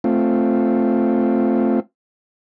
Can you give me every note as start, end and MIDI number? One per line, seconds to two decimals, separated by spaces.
0.04 1.80 57
0.04 1.80 60
0.04 1.80 65